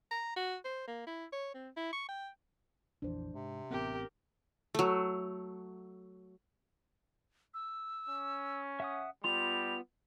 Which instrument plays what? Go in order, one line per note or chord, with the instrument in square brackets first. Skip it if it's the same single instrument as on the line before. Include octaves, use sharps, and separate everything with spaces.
[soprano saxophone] A#5
F#4
C5
A#3
E4
C#5
C4
E4
C#6
G5
[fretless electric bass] A#1 F2 E3 [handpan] D4 C5
[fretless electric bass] G#2 [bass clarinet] C3
[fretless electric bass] A1 B3 C4 [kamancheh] G4 A#4
[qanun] F#3 A3
[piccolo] E6
[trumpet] C#4
[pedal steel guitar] E5 F#5 D#6
[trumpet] G3 [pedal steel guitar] B3 F4 C6 [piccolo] F7